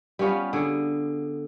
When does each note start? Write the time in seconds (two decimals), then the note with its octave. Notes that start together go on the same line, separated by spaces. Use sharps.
0.19 G3 B3 C#4 F4
0.53 D3 G#4